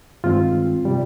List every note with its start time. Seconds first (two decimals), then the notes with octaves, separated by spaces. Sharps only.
0.24 G2 D#3 G#3 C4 F4
0.85 C3 G3